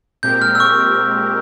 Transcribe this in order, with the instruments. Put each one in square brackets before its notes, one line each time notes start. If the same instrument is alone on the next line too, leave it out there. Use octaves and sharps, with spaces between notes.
[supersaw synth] A#2 G#3 C4 G4 A#4 [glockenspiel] G6
[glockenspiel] F6
E6
C#6